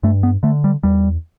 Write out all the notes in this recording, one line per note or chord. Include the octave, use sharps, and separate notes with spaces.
G2 A3
B3
D3 A3
G3
E2 G3